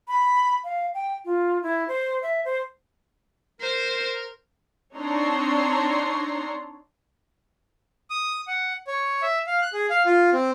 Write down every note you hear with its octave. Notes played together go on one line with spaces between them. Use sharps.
B5
F5
G5
F4
E4
C5
E5
C5
A#4 C5
C4 D4 D#4 C#5 A#5 C6
D#6
F#5
C#5
E5
F5
F#6
G#4
F5
F4
C4